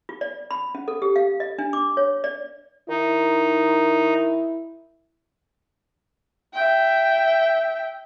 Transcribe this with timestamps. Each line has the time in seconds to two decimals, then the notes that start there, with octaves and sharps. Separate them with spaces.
0.09 F4
0.21 D5
0.51 B5
0.75 C#4
0.88 A4
1.02 G4
1.16 F5
1.40 D#5
1.59 D4
1.73 D6
1.97 C#5
2.24 D5
2.89 D#3 D#4 E4
6.54 E5 G5